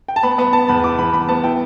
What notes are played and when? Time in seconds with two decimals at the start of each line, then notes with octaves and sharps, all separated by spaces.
0.08 G5
0.16 A5
0.23 B3 B5
0.38 B3 B5
0.53 B3 A5
0.69 E2 B5
0.84 E4 D6
0.99 E3 B5
1.13 E2 B5
1.29 B3 A5
1.44 E4 G5